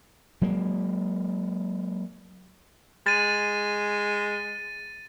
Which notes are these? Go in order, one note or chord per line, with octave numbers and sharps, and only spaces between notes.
F#3 G#3 A#3
G#3 A6 D#7